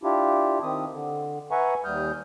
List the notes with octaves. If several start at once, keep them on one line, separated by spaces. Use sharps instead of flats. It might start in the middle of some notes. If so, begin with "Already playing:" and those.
D4 E4 F4 G4
D#3 C4 D#6
D3
B4 E5 F#5 G#5 A#5 C#6
D#2 G3 D#6 F6 G6